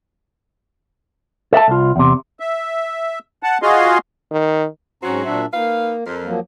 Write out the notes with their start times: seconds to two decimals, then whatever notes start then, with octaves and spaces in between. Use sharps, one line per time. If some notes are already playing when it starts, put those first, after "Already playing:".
1.53 A4 E5 F#5 A5
1.68 C2 F4
1.96 E2 C3
2.40 E5
3.43 F#5 A5
3.62 F4 F#4 G#4 D#5 F5 C6
4.31 D#3
5.03 G#2 F#3 C4 C#4 F#4 A#5
5.25 A#2 D4 E5
5.54 A#3 D#4 B4 F5
6.07 F2 A#4
6.24 F3 F#3 A#3